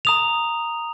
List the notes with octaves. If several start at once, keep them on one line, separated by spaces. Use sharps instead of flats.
A#5 D#6 F7